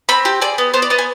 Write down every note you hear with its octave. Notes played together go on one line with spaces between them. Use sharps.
C4 B5
G4
G#4 D5
B3
B3 C5
D5
B3 D#5
G#5